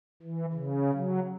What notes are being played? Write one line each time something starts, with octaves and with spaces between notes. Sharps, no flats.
E3
C#3
F#3